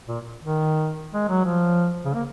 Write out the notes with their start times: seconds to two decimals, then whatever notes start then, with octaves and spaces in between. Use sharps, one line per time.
0.08 A#2
0.43 D#3
1.14 G#3
1.29 F#3
1.45 F3
2.05 C#3
2.15 A#3